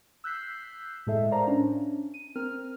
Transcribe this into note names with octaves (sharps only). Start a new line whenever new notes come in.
E6 F#6 G6 B6 C7
A2 G#3 A4 E5
A#4 C5 D5 F5 A5 A#5
C#4 D4
D#7
C4 A#4 F6